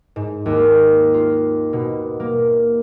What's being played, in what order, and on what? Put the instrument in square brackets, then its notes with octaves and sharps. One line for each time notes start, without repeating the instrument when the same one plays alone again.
[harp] G#2
D#2
F4
B2
A#3